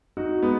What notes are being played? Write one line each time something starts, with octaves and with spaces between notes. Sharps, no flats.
D#4 F#4
G#3 B3